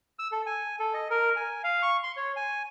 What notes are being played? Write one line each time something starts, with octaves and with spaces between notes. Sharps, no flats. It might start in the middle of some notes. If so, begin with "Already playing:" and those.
E6
A4
G#5
A4
D#5
A#4
G#5
F5
C#6
C6
C#5
G#5